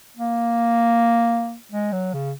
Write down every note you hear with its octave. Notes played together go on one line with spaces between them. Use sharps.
A#3
G#3
F#3
C#3